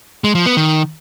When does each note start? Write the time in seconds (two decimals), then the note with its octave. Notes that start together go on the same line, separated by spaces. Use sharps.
0.24 G#3
0.35 F3
0.46 B3
0.57 D#3